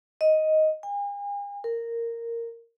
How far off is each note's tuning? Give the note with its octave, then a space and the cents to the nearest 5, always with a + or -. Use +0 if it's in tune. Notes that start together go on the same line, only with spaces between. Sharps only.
D#5 +5
G#5 -45
A#4 -10